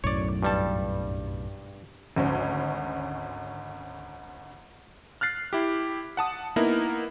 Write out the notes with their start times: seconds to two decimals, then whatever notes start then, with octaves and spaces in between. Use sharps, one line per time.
0.04 B1 F#2 A2 C#5 D5
0.43 G2 G3 A5
2.16 G#1 D2 C#4
5.21 F6 F#6 A6 C7
5.53 E4 G4
6.17 F#5 A5 D#6
6.56 A#3 B3 D#4 E4 A#4